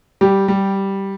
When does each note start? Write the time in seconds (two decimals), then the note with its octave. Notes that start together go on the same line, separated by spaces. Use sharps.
0.21 G3 G4
0.48 G3